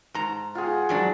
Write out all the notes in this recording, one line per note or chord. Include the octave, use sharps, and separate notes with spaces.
G#2 A#5
F4 G#4 F#5
G#2 F#3 D4